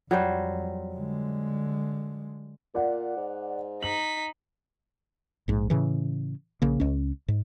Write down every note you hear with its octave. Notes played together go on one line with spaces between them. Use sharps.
F2 F#3 G3 C5
D3 G#3
A#2 D5 F#5
G#2
D#4 B6 F#7
A#1 G#2
A2 C#3 E3
A#1 C#3 A#3
C#2 C#4
G#2